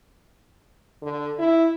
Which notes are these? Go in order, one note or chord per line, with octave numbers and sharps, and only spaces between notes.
D3
E4